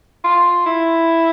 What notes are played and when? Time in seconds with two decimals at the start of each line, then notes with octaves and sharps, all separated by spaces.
0.24 F4
0.66 E4